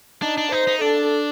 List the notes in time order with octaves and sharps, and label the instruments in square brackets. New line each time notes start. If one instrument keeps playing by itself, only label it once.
[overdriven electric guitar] D4 [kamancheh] D#4
[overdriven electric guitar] D4
[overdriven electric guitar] D#4 [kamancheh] C5
[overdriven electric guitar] D#4
[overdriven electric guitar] D4 [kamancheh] A4